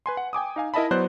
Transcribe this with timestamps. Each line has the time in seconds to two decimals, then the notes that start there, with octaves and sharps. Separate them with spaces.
0.06 B4 G#5 C6
0.17 F#5
0.33 G5 G#5 D6 D#6
0.56 D#4 F5 G#5
0.74 E4 A#4 D#5 E5 A5 B5
0.91 F#3 B3 C5 D5 F#6